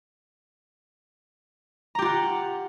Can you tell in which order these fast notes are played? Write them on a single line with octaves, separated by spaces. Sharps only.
A#5 G4 F4 F#5